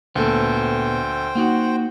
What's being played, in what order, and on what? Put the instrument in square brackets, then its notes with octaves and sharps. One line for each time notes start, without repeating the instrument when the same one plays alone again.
[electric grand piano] D2 A4 [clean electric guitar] A#2 B3 [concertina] C5 G5
[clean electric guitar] A#3 D#4 F#5 [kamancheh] F#4